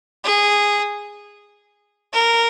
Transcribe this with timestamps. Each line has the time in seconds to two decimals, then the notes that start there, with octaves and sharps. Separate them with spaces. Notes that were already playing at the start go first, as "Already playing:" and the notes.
0.24 G#4
2.13 A#4